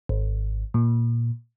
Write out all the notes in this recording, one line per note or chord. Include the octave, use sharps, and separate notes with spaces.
G#1
A#2